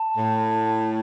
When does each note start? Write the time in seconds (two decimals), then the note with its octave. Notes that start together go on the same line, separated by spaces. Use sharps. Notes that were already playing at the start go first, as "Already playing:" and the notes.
Already playing: A5
0.17 A2